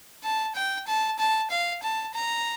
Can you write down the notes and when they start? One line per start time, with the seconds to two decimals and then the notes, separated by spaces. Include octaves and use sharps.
0.23 A5
0.56 G5
0.88 A5
1.19 A5
1.51 F5
1.83 A5
2.14 A#5